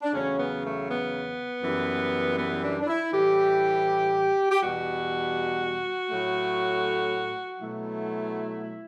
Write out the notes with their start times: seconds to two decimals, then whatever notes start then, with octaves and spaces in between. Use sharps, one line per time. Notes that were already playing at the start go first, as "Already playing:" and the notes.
0.02 D4
0.14 E2 C#3 F#3 A3 C#4
0.39 B3
0.64 A3
0.89 B3
1.63 F#2 E3 G3
2.37 B3
2.63 D4
2.80 D4
2.87 E4
3.12 A2 E3 G3 G4
4.51 G4
4.61 E2 B2 G3 F#4
6.10 A2 F#3 A3
7.59 B2 F#3 A3 E4